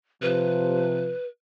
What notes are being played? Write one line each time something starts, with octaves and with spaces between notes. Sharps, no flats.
C3 F3 B4